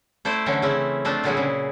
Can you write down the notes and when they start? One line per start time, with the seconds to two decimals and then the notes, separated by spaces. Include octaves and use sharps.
0.25 A3 E4 C5 D5
0.46 D3 E3 F#3 C#4
0.62 C#3 C4 C#4 E4
1.05 F3 A3 C4 D4 F4
1.24 A#2 D3 F#3 G3 E4 G#4
1.37 C#3